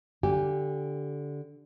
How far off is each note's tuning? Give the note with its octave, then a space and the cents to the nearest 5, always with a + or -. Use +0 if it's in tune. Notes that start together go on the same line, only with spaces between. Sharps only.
D3 -10 G4 -10 G#5 -35